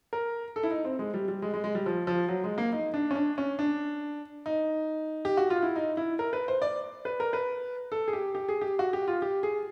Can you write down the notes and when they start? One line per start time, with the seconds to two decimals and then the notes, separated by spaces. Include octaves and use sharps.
0.13 A#4
0.56 A4
0.63 E4
0.71 D#4
0.85 C4
0.99 G#3
1.14 G3
1.28 G3
1.42 G#3
1.54 G#3
1.64 G#3
1.75 G3
1.86 F3
2.07 F3
2.29 F#3
2.44 G#3
2.58 A#3
2.72 D#4
2.94 D4
3.11 C#4
3.15 D4
3.38 C#4
3.59 D4
4.46 D#4
5.25 G4
5.37 F#4
5.50 F4
5.62 E4
5.76 D#4
5.97 E4
6.19 A#4
6.33 B4
6.48 C5
6.62 D5
7.05 B4
7.20 A#4
7.33 B4
7.92 A4
8.08 G#4
8.13 G4
8.35 G4
8.49 G#4
8.61 G4
8.79 F#4
8.93 G4
9.08 F4
9.22 G4
9.43 G#4